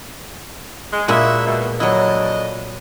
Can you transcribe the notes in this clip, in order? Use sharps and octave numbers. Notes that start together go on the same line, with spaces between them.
G#3
A#2 G#3 A#3 E4 F#4 E5
B2
F2 F#3 D4 E4 D#5